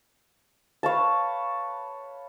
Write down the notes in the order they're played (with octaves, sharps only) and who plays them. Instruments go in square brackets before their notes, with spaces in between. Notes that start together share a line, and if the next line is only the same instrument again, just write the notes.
[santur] B4 C#5 F5 A5